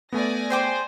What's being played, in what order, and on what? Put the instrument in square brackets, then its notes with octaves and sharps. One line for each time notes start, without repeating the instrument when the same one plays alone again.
[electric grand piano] A3 B3 [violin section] D5 G#5 A#6
[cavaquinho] G#4 G5 D6 [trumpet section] C5